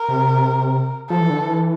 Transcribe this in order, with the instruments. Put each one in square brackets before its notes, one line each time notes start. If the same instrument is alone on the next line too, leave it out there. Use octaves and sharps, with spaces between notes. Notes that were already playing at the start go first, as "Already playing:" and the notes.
Already playing: [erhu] A#4
[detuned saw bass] C3
[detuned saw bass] F3 [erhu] A4
[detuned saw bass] E3
D3
E3